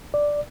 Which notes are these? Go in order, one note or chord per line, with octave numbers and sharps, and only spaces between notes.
D5